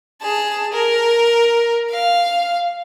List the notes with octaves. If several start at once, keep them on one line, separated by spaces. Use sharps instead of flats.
G#4 A5
A#4
F5